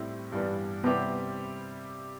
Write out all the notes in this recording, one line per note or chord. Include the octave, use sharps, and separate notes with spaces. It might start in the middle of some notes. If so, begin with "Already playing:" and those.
Already playing: A2 G3 C4 E4
G2 E3 G3 B3 D4
C3 G3 B3 C4 E4 G4